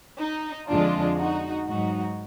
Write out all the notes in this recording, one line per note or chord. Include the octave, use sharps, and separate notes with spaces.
D#4
F2 D3 F3 G#3 D4 F4
D#4 F#4
G#2 F#3 D#4 F#4